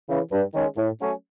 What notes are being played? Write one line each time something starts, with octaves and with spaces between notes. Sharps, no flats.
C#3 E3
G2
D#3 G#3 C#4
A2
F#3 A3 C#4